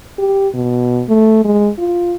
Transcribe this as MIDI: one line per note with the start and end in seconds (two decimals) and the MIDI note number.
0.19 0.48 67
0.54 1.03 47
1.09 1.44 57
1.45 1.70 56
1.78 2.16 65